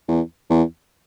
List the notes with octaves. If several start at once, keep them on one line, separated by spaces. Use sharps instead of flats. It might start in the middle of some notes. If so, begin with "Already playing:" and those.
E2
E2